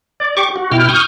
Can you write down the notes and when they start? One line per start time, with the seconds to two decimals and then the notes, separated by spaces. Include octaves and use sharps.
0.20 D5
0.37 G4 C#6 D6
0.56 F#4
0.72 B2 E4 G5 F6
0.89 C#6 D#6 F6 G6